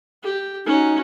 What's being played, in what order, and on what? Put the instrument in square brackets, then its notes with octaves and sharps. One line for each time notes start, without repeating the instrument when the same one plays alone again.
[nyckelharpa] G4
[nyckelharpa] C#4 F#4 [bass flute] D#4